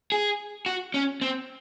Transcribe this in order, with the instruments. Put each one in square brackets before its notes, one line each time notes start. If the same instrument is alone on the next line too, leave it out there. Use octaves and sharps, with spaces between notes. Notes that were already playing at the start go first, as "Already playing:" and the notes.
[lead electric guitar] G#4
F#4
C#4
C4